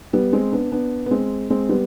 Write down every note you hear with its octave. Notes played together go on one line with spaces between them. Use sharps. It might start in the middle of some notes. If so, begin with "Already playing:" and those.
G3 B3
G#3 C4
B3 D4
B3 D4
B3
G#3 C4
G#3 C4
G3 B3